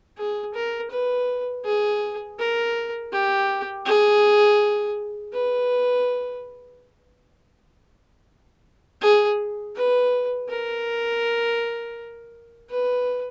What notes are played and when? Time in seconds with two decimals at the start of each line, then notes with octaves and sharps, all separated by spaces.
0.18 G#4
0.54 A#4
0.91 B4
1.65 G#4
2.39 A#4
3.12 G4
3.86 G#4
5.33 B4
9.02 G#4
9.76 B4
10.49 A#4
12.70 B4